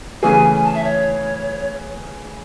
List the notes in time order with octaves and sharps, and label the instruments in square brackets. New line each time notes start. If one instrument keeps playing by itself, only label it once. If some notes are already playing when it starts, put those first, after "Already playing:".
[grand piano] C#3 E3 A3 C#4 G#4 [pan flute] G#5
[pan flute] G#5
A5
E5
C#5